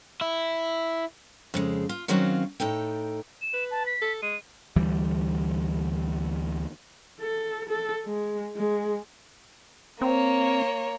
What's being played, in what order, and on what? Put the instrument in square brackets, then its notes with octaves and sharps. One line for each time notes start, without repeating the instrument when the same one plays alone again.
[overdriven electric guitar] E4
[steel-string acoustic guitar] F2 C#3 G#3
F4
D#3 F#3 C4 C#4 F#4 F5
A2 D#4 A4 G5
[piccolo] E7
[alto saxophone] B4
[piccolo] A5
B6
[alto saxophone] A4
[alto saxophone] G#3 [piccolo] D#7
[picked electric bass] D2 E3 G3
[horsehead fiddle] A4
A4
G#3
G#3
[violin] A#3 C#5 [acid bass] C4